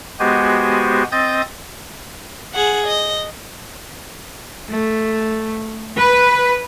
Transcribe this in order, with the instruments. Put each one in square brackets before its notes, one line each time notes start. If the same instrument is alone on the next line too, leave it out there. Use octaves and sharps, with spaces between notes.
[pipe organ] G#3 B3 F#4 G4 C5 G#5
C4 D#5 D#6 G6 A6
[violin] G#4 F#5
D#5
[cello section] A3
B4